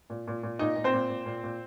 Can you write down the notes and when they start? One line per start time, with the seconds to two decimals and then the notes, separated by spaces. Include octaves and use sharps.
0.10 A#2
0.27 A#2
0.43 A#2
0.59 A#2 D#4 D#5
0.76 A#2
0.84 C4 C5
0.93 A#2
1.09 A#2
1.26 A#2
1.44 A#2